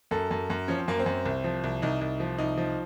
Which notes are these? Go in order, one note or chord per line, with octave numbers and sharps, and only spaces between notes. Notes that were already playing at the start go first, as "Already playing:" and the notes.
F#2 A4
F#2
F#2
F3 C#4
C4
F#2 A#3
C4
F#2
C2
F3
C2
C2 D#4
C2
F3
C2 D#4
F3